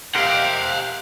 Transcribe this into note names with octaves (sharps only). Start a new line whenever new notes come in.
G4 A#4 C5 F5 F#5